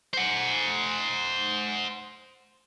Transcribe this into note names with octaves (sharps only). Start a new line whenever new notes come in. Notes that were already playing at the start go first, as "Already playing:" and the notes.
C5 F#5